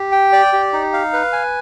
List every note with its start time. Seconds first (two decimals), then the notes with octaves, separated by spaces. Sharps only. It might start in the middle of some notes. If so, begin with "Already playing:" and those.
Already playing: G4
0.12 G5
0.33 D5
0.53 G4
0.73 D#4
0.93 F5
1.13 B4
1.32 G#5